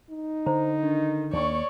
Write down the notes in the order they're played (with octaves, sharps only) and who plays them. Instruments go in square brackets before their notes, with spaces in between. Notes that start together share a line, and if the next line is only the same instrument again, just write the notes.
[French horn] D#4
[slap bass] D3 [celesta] C5 A#5
[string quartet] D#3 [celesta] D4
[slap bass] D#2 A#3 [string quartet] C#5 D5 C#6